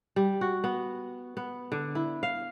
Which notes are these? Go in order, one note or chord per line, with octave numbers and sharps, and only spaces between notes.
G3
F#4
B3
B3
D3
E4
F5